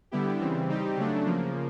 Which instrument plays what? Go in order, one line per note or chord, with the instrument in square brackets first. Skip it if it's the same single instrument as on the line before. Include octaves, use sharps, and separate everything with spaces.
[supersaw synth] D3 G3 B3 E4 G4
C#3 E3 G3 C4
G3 C4 D#4 G4
C#3 F#3 A3 D4
C#3 F3 A#3